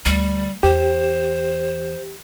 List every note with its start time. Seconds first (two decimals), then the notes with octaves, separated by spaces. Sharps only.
0.06 D2 G3
0.63 E2 G4 C5